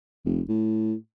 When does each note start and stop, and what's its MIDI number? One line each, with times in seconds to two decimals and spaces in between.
0.25 0.41 29
0.48 0.93 45